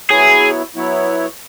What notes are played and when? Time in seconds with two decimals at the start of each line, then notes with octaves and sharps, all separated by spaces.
0.10 F#3 B3 E4 G#4 C#5
0.75 F#3 B3 E4 C#5